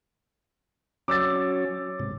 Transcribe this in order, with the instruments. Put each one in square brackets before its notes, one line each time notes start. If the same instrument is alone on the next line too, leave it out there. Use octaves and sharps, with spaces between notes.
[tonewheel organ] F#3 C#4 C#5 [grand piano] D6 E6 A6
[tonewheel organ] G#2 C3